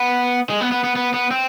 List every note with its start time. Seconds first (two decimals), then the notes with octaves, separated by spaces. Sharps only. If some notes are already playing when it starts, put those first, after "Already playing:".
Already playing: B3
0.50 G#3
0.61 B3
0.72 B3
0.84 B3
0.96 B3
1.14 B3
1.31 C4